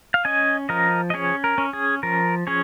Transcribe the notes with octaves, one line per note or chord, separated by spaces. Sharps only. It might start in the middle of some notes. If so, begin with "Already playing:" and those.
F5
C#4 D#5 G#5
F3 A#4 D#5
D#5
C#4 G#4 C#5
A#4
C#4
G#4
F3 A#4
C#4 G#4 C#5